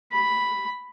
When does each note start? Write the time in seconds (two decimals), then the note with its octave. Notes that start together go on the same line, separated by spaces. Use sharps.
0.12 B5